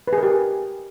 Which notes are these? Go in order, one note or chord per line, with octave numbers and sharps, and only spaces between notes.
B4
G#4
A#4
G4